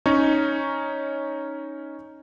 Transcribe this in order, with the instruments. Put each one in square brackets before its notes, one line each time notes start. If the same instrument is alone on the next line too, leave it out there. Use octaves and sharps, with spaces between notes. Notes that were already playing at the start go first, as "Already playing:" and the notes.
[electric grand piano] C#4 D#4 C#5